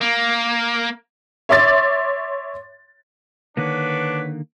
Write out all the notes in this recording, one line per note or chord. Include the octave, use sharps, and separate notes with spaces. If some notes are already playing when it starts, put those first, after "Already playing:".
A#3
C#5 E5 C6 D6 A6
D3 D#3 A#3 D4 B4 C#5 F#5